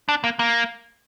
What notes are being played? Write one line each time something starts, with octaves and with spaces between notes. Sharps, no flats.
D4
A#3
A#3